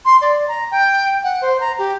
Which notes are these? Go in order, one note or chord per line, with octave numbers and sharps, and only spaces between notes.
C6
D5
A#5
G5
F#5
C5
A#5
G4